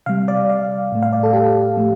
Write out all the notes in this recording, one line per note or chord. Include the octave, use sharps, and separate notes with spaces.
C3 G3 F5
D5
F5
A2 A3
F5
D5
A4
G4
A2 F3 A3